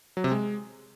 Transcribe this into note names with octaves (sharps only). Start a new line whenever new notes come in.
F#3
C3
G#3